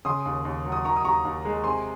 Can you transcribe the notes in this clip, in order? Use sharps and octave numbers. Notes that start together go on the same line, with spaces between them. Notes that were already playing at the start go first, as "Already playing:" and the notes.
C#3 C6 D#6
D#2
D#2
F#3
D#6
D#3 A#5 C#6
D#6
D#2 A#5 C#6
D#2
G#3
C3 G#5 C6